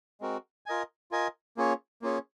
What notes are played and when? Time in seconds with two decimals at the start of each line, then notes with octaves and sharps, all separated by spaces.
0.21 G#3 C4 F#4 A#4
0.66 F4 A#4 D#5 G#5
1.11 F4 A#4 D#5 G#5
1.57 A#3 C#4 F4 G#4 C#5
2.02 A#3 C#4 F4 G#4 C#5